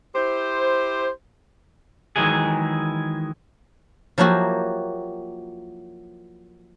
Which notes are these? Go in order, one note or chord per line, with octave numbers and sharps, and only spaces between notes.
E4 G4 C5
D#3 E3 F#3 G#3 G#4
F3 F#3 A#3 E4 F#4 G4